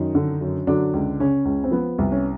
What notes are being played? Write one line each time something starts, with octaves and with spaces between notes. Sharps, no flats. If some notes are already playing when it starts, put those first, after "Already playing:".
Already playing: F#2 D#3 D#4
D3
F#2
D3 F#3 D4
C#2
C#3 C#4
C#2
C4
F3 B3
C2
C#4